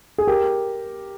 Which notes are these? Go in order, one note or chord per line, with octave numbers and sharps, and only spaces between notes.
G#4
G4 A#4